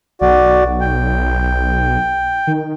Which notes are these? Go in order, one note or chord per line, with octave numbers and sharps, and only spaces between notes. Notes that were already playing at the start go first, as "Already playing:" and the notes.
B1 F#4 D5
G5
D#3